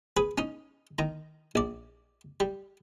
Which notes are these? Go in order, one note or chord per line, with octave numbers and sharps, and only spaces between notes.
G#4 B4
C#4 D#4
D#3 A#5
A#1 D5
G3